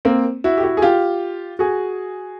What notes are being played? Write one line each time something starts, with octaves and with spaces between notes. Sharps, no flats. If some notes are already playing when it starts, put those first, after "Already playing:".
A#3 C4
E4 F#4
G4
E4 F#4
G#4
F4 G4
F#4 G#4